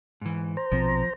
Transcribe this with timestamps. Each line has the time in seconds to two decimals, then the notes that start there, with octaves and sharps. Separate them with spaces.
0.21 G#2 E3
0.57 C5 A#5
0.72 A#1 B2 F3 C4